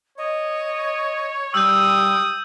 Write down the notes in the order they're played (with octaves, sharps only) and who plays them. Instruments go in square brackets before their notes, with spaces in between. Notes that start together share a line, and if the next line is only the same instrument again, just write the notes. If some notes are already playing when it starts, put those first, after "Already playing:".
[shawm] C#5 [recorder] D#5
[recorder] G3 [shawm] G5 [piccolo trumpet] D#6 [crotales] E6 G6